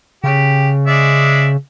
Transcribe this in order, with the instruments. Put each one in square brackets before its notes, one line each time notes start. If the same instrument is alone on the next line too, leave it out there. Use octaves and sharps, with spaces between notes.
[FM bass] C#3 [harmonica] G4
[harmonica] G#3 D5 E5